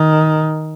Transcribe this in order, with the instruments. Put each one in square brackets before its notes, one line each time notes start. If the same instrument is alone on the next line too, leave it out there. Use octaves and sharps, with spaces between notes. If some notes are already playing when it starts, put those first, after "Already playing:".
Already playing: [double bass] D#3